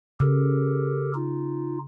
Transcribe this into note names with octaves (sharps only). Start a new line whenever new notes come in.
C#3 G4 A4 A#4
D#4 F4